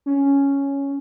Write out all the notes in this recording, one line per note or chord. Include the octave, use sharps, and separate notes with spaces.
C#4